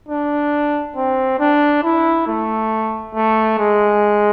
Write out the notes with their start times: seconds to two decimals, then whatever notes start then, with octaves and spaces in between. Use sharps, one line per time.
0.08 D4
0.96 C4
1.39 D4
1.84 E4
2.27 A3
3.15 A3
3.59 G#3